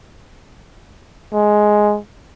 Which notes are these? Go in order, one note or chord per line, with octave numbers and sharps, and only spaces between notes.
G#3